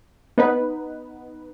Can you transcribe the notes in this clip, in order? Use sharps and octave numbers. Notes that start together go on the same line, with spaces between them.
B3 D#4 B4